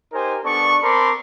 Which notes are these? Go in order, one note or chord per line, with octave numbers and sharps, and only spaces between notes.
D#4 G4 A#4 C5 G#5
B3 D4 A4 D5 C#6
C4 A#4 A5 B5 C6 D6